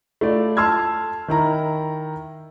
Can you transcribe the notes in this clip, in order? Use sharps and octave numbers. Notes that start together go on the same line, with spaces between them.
A3 E4 F4 D5
A5 C6 E6 F6 G#6
D#3 E4 A#5